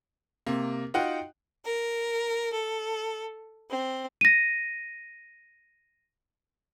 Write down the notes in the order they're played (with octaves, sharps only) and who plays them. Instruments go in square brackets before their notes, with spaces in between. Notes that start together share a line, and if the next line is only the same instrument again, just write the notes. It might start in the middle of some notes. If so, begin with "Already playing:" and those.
[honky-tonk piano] C3 A#3
D#4 F4 F#4 F#5 G5
[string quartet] A#4
A4
C4
[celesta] A#6 D#7